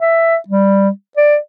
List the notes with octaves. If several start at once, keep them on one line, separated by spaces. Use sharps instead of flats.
E5
G3
D5